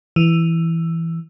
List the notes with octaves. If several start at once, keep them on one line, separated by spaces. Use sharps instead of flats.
E3